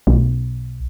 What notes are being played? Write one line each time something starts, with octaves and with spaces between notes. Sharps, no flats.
B1